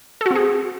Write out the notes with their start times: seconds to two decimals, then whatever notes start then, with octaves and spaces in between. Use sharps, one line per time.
0.21 A4
0.26 F#4
0.31 C4
0.35 G#4